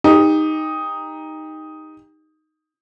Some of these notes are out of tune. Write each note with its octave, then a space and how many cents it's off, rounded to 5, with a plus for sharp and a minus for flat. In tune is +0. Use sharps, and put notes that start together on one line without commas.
D#4 +0 G4 +30